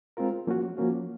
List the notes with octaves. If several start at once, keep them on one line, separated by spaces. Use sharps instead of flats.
G#3 C4 F4 A#4
F3 A#3 C#4 F#4
F3 A#3 C#4 F#4